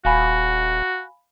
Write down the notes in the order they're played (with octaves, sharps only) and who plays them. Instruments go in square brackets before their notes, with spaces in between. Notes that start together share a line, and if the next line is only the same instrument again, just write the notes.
[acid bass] D#1 [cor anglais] F#4 [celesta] F5 G#5 B5